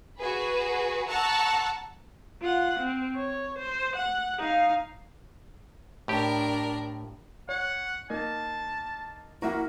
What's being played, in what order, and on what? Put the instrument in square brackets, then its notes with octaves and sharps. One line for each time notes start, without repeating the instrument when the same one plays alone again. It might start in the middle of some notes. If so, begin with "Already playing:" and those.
[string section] F#4 G#4 B4
F#5 A5 A#5 C#6 E6 F#6
[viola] F4 F#5
C4
C#5
C5
F#5
D#4 F5
[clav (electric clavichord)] A2 G4 [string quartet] D4 A#4
[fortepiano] C#5 [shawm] F#5
[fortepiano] A#3 D#4 [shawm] A5
[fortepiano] A#3 F#4 [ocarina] E4 [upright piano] A#4 E5 F#5